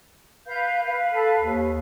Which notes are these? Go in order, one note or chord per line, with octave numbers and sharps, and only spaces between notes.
B4 F5 G6
B4 F5
A4
D#2